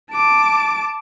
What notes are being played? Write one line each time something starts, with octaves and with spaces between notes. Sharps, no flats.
A5 D6